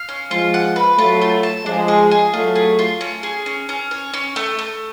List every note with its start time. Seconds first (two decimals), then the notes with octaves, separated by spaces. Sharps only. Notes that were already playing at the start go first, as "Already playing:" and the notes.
Already playing: F5
0.09 C#4
0.30 F3 G#3 F4
0.54 F#5
0.76 B4
0.98 F#3 A3 F4
1.22 F4
1.43 A5
1.66 F3 G#3 D4
1.88 G#4
2.11 G#4
2.33 F#3 A3 F4
2.55 G#4
2.79 F4
3.01 C#4
3.23 G#4
3.46 C#4
3.69 C#4
3.91 C#5
4.14 C#4
4.36 A3
4.59 A3